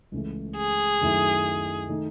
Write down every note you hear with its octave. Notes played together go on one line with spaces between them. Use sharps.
C#2 C#3 E3 A3
G#4
F#2 D#3 A3 E4
D#3 A3 D#4